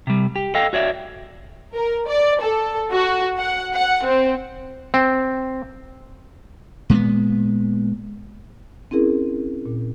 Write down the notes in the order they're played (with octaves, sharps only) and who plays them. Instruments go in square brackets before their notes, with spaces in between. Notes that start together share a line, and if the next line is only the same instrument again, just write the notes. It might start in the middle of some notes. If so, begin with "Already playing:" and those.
[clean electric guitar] C3 G3
G4
A4 D#5 F5 G5
F#4 C#5 D5 E5
[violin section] A#4
D5
A4
F#4
F#5
F#5
C4
[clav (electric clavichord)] C4
[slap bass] A#2 G#3 A#3 B3
[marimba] C4 C#4 E4 G#4 A#4
A#2